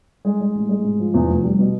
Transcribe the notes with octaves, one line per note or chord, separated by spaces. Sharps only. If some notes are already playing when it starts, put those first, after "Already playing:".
G#3
G#3
A1
G#3
G#2
F3
E2
F1
G3
B2